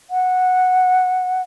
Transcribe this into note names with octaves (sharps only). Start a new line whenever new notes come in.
F#5